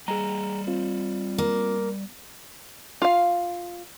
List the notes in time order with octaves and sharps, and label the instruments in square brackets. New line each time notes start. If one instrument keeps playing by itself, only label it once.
[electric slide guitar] G3 D#5 [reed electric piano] G#4 A#5
[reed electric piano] C4 F4
[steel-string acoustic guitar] A#3
[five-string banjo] F4 F5